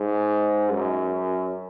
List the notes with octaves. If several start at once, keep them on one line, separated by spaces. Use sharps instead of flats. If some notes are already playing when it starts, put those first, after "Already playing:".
Already playing: G#2
F#2